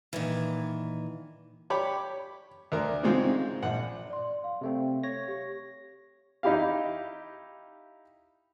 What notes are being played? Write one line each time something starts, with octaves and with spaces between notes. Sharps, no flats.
A#2 D#3 E3
G4 C#5 B5 D6
D2 A#4
G#2 C#3 G#3 C4 F4
A#1 F#5
D5 C6
F5
C3 A3 C4
C#5 A#6
G4
D#4 E4 G4 F5